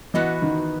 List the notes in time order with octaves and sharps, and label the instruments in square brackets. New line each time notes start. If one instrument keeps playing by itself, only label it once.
[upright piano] E3 [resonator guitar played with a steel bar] B3 F#4 B4 D#5
[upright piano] D#3